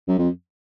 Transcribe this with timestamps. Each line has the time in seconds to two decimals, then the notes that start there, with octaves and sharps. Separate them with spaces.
0.08 F#2
0.19 F2